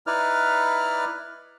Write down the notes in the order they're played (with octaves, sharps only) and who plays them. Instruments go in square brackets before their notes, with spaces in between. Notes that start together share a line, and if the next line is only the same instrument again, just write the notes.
[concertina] D#4 E4 B4 D5 F6